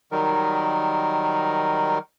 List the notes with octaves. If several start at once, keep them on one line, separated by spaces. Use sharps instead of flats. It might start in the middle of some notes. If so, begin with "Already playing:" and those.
D#3 F#3 G3 D#4 A#4